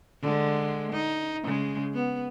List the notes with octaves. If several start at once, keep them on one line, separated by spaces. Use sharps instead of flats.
D3 G#3
D#4
C#3 G#3
B3